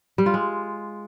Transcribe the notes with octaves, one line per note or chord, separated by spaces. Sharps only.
G3
F4
G#3